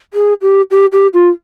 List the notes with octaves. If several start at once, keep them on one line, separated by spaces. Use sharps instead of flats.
G#4
G4
G4
G4
F4